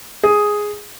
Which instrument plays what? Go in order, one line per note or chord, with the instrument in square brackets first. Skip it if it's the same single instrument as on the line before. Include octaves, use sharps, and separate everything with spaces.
[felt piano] G#4